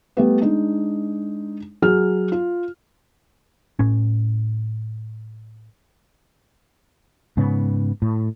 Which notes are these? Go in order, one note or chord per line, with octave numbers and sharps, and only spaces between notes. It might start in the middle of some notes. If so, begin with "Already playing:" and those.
G3 A3 B3
G#3 D4 D#4
F#3 F#4 G#4 F6
F4
A2 C#4
G#2 C#3 B3
A2